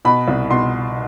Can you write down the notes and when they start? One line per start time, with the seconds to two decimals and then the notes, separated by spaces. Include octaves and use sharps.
0.05 B2 B5
0.28 C2
0.50 B2 C6